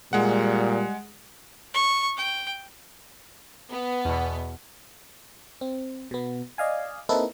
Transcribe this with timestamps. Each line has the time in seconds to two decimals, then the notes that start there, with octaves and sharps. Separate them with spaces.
0.13 A#2 G3 G#3 F#5
1.74 C#6
2.17 G5
3.70 B3
4.05 E2 B2
5.61 C4
6.11 B2 B3
6.58 D5 D#5 F5 G#5
7.09 A#3 C4 D#4 E4 A4 B4